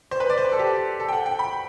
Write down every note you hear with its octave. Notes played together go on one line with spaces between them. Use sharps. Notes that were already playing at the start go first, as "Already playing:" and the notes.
C5
B4
D5
C5
B4
A4
G4
A4
G5
F#5
G5
B5